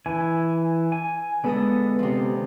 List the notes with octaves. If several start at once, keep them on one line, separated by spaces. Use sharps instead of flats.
E3 E4 G#5
G#5
D3 G#3 B3 A4 D#5
C3 F3